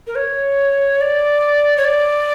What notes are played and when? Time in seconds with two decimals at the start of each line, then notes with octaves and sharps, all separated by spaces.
0.07 A#4
0.15 C#5
1.01 D5
1.77 C#5
1.85 D5